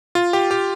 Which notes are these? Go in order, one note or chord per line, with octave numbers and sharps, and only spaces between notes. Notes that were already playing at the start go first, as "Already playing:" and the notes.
F4
G4
G4